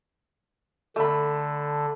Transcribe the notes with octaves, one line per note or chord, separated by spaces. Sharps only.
D3 A3 B5